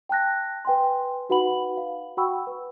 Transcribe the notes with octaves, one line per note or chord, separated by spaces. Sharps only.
G5 A5 F#6 A#6
B4 G5 G#5 C6
D#4 F#4 B4 F#5 B5 F#7
F5
F#4 F#5 G5 B5 C#6 E6
B4